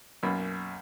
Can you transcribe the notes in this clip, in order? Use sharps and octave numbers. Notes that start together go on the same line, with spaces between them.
B1 F#2 A#3 B5